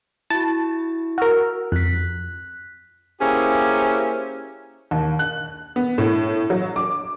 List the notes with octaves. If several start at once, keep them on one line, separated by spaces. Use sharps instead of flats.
E4 F#4 A5
F#4 A#4 E6 F6
F2 F#6 B6
A#3 C#4 E4 G4 G#4 C5
D#2
F#6
B3
A2
F#3
D6